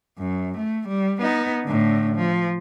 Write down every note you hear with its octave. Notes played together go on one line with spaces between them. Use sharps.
F#2
A3
G3
B3 D#4
A2 D3
F3